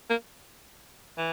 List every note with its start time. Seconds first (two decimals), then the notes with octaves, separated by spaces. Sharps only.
0.10 A#3
1.18 E3